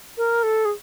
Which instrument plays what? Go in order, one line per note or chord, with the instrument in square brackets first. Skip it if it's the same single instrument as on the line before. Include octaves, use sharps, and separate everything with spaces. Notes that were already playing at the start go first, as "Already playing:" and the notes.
[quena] A#4
A4
G#4